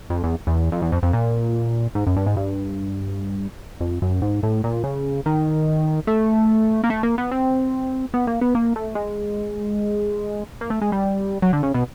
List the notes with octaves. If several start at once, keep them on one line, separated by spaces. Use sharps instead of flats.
F2
E2
E2
F2
E2
F2
F2
A#2
G#2
F#2
G2
G#2
G2
F2
F#2
G#2
A2
A#2
C#3
D#3
A3
A#3
A3
A#3
B3
C4
B3
A#3
B3
A#3
A3
G#3
A#3
A3
G#3
G3
F#3
D3
C#3
B2